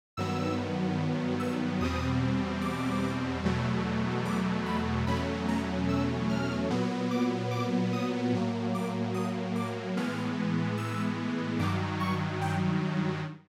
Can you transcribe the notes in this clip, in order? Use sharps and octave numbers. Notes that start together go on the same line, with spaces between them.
G2 D#3 F#3 B3 E6
E6
E2 B2 G3 C4 D#6
D6
E2 B2 F#3 A3
D6
B5
E2 B2 F#3 A3 C#4 B5
A#5
E6
F6
A#2 F#3 B3
D6
D6
D#6
A2 F#3 A#3
D6
D#6
D6
A2 E3 G#3 B3 F6
E6
G2 D#3 F#3 D6
C#6
G5